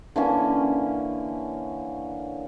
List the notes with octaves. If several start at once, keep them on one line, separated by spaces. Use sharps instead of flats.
D3 E3 A#3 C#4